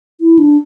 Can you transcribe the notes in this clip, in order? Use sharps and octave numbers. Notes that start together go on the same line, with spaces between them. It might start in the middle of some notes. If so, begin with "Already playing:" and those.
E4
D4